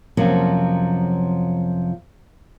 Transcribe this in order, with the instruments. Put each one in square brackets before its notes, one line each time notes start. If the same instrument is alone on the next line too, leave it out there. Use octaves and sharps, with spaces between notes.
[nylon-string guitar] F2 C3 F3 F#3 A#3 C#4